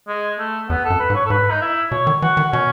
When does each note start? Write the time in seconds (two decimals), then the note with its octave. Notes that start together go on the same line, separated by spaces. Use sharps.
0.08 G#3
0.39 A3
0.70 E2 B3
0.85 A4
0.90 F#2
1.00 B4
1.10 G#2
1.14 C#5
1.26 A4
1.30 G#2 B4
1.51 D#4
1.61 E4
1.91 B2 C#5
2.07 D#3
2.22 E3 F#4
2.37 D#3
2.52 B2 C#4